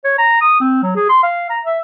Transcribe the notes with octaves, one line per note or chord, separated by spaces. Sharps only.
C#5
A#5
D#6
C4
F#3
G#4
C6
F5
A#5
E5